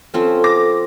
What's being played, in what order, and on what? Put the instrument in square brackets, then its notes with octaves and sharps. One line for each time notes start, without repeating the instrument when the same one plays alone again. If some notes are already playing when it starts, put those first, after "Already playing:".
[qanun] F3 C4 C#4 [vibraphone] A4
[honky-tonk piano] D6 A#6